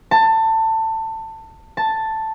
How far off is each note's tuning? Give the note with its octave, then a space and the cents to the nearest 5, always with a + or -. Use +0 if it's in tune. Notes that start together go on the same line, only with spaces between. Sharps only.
A5 +20
A5 +5